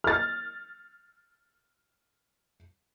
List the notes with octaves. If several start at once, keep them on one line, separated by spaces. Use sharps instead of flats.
F6 A6